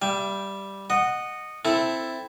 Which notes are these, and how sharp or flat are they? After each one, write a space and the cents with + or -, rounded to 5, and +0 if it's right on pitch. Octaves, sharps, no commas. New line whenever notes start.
G3 +0 E5 +35 G5 +0
D#5 -15 F#5 +0
C4 +0 E4 +0 A4 +5